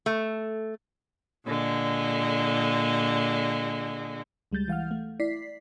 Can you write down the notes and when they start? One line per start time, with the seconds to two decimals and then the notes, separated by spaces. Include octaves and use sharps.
0.06 A3
1.46 A#2 D3 G#3
4.52 C#2 G3 G#3 G6 A6
4.68 E3 F5 F#5 F6
4.91 A3
5.20 E4 D5 B6 C7